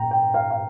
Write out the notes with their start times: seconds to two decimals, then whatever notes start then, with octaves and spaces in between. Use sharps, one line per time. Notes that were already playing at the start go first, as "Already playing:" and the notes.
Already playing: A#2 G5 A#5
0.11 G5
0.34 F5
0.51 F5